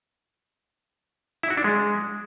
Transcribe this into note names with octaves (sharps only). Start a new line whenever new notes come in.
E4
F#4
D4
G#3